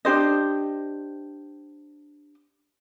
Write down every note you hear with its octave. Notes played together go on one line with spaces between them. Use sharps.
D4 G4 C5 D#5